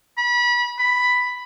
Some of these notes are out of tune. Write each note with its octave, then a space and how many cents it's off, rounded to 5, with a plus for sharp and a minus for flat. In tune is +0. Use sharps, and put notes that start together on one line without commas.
B5 -30
B5 +5